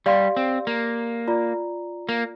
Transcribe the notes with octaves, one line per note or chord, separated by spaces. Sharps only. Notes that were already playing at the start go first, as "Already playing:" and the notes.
G3 G4 D5 F5 C6
C4
A#3
F4 D5 A#5
A#3